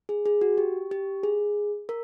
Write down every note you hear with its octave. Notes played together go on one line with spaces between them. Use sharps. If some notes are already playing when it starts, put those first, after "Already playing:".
G#4
G#4
F#4
G4
G4
G#4
A#4